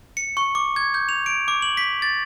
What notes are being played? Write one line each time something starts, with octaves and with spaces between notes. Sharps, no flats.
C#7
C#6
D6
G#6
G6
F7
D7
D6
F#7
B6
A6